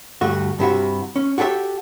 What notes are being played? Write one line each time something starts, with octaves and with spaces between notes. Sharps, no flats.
D2 G2 A3 F#4
G2 C3 E4 F#4
C#4
F#4 G4 A4 C5 E5